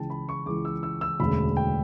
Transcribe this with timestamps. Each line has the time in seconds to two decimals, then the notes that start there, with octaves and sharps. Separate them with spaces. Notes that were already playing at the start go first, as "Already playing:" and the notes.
Already playing: C#2 C#3 E3 G5 A5
0.10 B5
0.29 C#6
0.46 C#2 C#3 E3 D6
0.65 E6
0.83 E6
1.01 E6
1.20 E1 D2 C#3 B5
1.57 G5